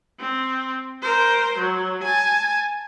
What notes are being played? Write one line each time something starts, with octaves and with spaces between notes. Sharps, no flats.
C4
A#4 C5
F#3
G#5 A5